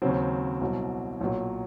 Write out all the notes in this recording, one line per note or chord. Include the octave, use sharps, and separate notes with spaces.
D#2 C#3 F#3 C4
C2 B2 F#3
B1 A#2 F#3